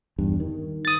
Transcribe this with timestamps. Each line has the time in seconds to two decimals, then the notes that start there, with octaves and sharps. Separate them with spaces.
0.19 E2 G2
0.40 D#3
0.85 D#6 A6